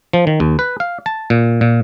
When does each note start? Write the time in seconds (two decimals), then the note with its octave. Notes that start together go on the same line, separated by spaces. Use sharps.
0.13 F3
0.27 D#3
0.40 D#2
0.59 B4
0.80 F5
1.06 A5
1.30 A#2
1.61 A#2